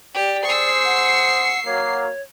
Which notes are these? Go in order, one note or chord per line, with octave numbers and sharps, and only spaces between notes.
G4 D5
G#4 C5 C#6 E6 C7
F#5
F#3 A#3 C#5